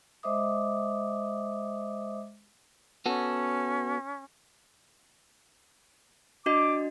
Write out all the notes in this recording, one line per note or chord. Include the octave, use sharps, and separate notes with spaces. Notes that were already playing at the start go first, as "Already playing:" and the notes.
G#3 C5 D#5 E5 D6 D#6
B3 C#4 F#4 A4
D4 F#4 D#5 D6